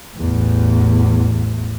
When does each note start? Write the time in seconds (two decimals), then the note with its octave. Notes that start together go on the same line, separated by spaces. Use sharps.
0.15 A1 E2